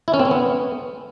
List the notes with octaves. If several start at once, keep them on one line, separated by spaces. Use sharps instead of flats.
E4
C#4
C4
C#4
B3